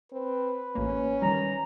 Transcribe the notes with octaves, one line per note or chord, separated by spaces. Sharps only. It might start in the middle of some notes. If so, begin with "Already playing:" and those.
C4 B4
A1 A#3 C#4
D#3 G3 A#5